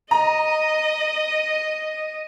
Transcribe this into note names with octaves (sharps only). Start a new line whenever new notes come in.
D#5 A#5